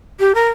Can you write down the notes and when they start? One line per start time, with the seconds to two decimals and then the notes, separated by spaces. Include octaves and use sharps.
0.19 G4
0.35 A#4